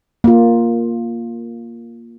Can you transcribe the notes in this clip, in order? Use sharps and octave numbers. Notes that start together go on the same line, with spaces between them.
A#3 F4